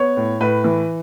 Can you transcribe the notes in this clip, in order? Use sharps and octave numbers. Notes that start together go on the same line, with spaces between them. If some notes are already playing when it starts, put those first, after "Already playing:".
Already playing: B3 C#5
A2
A2 B4
E3